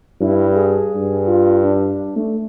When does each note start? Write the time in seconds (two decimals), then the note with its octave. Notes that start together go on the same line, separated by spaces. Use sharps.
0.21 G2 E4
0.55 G#4
0.95 G2
1.27 F4
1.64 D4
2.16 A3